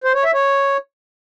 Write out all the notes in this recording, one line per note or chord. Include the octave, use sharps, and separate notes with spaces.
C5
C#5
E5
C#5